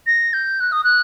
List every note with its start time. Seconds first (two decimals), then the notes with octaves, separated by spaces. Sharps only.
0.07 A#6
0.33 G6
0.60 F#6
0.72 D#6
0.84 F#6